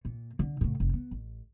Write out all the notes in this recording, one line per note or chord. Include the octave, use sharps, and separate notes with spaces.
A#2
D3
A2 C#3
F1
B3
A1